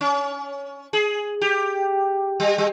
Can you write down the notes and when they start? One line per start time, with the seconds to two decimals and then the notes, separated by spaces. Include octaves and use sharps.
0.01 C#4
0.93 G#4
1.41 G4
2.40 G3
2.58 G3